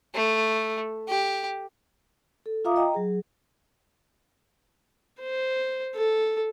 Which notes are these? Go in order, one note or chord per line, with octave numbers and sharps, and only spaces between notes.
A3
G4
A4
F4 E5 F5 A#5 D6 D#6
D#5 G5 A#5
F#3 G#4
C5
A4